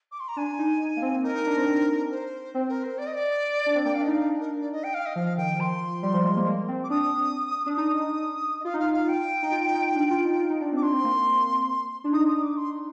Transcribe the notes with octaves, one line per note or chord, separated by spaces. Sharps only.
D6
C6
A#5
D4 G#5
D#4
A#3
C4
D#4 A#4
D#4
D4
C4
C5
C4
A#4
C5
D5
D#5
D5
D4
C4
A#3 G5
D4 F5
D#5
D#4
F5
D#4
D4
A#4
D5
D#5
G5
F5
D#5
F3 F5
D#3 G5
F3 C6
G3
F3
G#3
A#3
A#3
C4
D6
D4 D#6
D4
D#4 D#6
D#5
F4 F5
D#4
F4 F5
F5
G5
D#4
F4
D#4
D4
F4
D#4
F4
D#4
D4
C4
D6
D4 C6
C4
A#3
A#3
D4
D#4 D#6
D#6
D6
C6